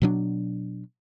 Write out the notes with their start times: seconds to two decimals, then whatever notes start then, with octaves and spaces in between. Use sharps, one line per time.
0.02 B2 F#3 D4